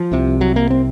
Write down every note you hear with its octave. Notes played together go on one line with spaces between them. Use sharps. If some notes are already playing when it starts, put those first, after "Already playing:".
Already playing: F3
C2 C3
F#3
A#3
C4